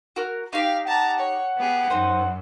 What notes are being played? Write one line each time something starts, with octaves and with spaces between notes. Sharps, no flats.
F#4 A#4 F6
D#4 G4 F5
F#5 A5 A#5
C#5
B3 G4 G#4
F#2 C4 D#4 C5